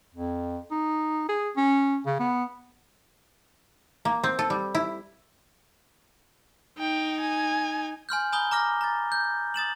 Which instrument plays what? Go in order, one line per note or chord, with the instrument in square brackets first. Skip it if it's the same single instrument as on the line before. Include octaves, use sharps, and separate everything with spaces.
[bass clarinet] F2
D#4
G#4
C#4
C#3
B3
[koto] A#3
C4
A4
G3
E4
[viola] D#4 [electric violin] G5
[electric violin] G#5
[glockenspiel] G#5 C6 F6 G6
G#5 A#5 B5 D#6 G6 G7
A#5 D6 F6 A#6
A#5 A6
G6
D#6 A6 E7 F#7